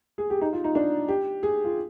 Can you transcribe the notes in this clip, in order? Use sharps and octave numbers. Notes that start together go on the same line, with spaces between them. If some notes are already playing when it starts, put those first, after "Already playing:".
G#4
G4
D#4
F4
D#4
D4
G4
G#4
F4